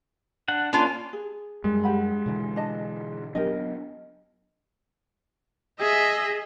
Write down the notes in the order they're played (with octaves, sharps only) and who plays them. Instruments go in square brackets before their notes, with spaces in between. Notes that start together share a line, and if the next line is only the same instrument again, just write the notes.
[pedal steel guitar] D4 F#5
[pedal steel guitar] A#3 C#4 [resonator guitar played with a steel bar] D4 F4 G#5
[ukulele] G#4
[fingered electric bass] F#2 G3 [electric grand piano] G#3
[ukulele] G4 F#5 B5
[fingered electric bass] B2 D3 E3
[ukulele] D4 D#5 A5
[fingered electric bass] F#3 B3 D4 [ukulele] G4 A#4 D#5
[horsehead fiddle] G#4 [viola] D#5 E5